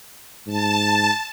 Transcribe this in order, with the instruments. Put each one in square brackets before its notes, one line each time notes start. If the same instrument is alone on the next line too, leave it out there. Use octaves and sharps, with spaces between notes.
[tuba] G#2 [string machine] A5